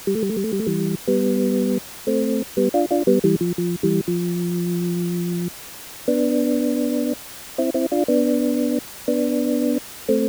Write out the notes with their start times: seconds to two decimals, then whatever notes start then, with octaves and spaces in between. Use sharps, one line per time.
0.07 G3
0.15 A3
0.23 G3
0.29 A3
0.36 G3
0.44 A3
0.53 G3
0.59 A3
0.66 E3 G3
1.08 G3 B3
2.07 A3 C4
2.57 G3 B3
2.74 D4 F4
2.91 D4 F4
3.07 G3 B3
3.24 E3 G3
3.41 F3
3.58 F3
3.83 E3 G3
4.08 F3
6.08 B3 D4
7.58 C4 E4
7.74 C4 E4
7.92 D4 F4
8.08 B3 D4
9.08 B3 D4
10.09 A3 C4